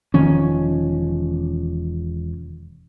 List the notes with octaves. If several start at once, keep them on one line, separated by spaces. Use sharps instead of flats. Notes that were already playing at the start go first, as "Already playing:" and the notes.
E1 D#3 F3 C#4